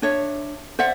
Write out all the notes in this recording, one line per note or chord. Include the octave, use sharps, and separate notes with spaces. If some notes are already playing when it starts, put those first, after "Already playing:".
D4 C#5 E5
C5 D5 E5 F#5